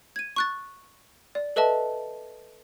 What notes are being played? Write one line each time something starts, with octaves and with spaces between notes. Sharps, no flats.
G#6 D#7
C#6 F#6 A6
D5
A4 B4 D#5 E5 A5